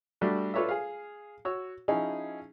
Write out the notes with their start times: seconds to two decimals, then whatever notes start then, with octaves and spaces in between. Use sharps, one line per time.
0.21 G3 A3 D4 F#4
0.54 F4 A4 B4 C#5 D5 E5
0.69 G#4 F5
1.45 F#4 C#5 E6
1.88 F3 C#4 D#4 E4 G#4